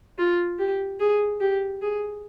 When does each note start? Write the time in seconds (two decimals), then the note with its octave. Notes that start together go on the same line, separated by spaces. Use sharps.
0.18 F4
0.59 G4
1.00 G#4
1.40 G4
1.82 G#4